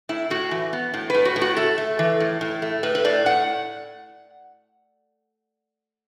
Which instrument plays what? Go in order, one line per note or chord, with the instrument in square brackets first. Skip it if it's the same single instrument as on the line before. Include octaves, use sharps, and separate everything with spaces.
[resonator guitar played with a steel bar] A2 E4
A2 F#4
E3
B3
A2
A2 B4
F#4
A2
F#4
A3 A4
A3
E3
A2
A2
A3
A2 B4
B4
A2 D5
A2 F#5